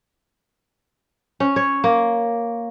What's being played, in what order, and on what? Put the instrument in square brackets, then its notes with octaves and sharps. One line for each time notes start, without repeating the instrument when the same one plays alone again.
[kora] C#4
C#5
A#3